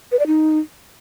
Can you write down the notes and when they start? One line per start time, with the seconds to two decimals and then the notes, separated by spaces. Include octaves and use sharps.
0.12 B4
0.19 D5
0.27 D#4